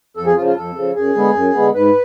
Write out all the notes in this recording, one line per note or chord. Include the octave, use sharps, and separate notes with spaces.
F2 A4
G#4
C#3 F3 F4
F4
F2 A4
C#3 F3
F#2 G#4
D3 G#3 B3
F#2
D3 G#3 B3
G#2 B4